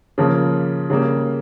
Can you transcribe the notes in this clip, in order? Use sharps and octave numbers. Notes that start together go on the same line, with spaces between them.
C#3 F3 A#3
C#3 G3 A#3